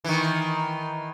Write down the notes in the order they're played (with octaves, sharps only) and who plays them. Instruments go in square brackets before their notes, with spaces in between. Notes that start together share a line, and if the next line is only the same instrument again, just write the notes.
[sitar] D#3 E3